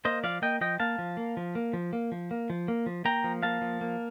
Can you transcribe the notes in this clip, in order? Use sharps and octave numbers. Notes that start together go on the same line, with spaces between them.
A#3 C5 D#5
F3 D5 F5
A#3 D#5 G5
F3 D#5 G5
A#3 F5 A5
F3
A#3
F3
A#3
F3
A#3
F3
A#3
F3
A#3
F3
A#3 G5 A#5
F3
A#3 F5 A5
F3
A#3